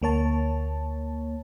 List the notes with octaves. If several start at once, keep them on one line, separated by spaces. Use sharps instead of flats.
D2 A#3 C#5 A5